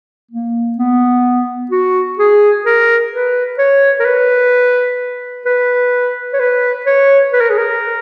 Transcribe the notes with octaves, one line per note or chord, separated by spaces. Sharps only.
A#3
B3
F#4
G#4
A#4
B4
C#5
A#4
B4
B4
C#5
B4
C#5
B4
A#4
G#4
A#4